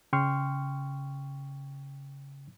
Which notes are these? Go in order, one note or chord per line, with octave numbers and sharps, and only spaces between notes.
C#3 G5 C6 C#6 F6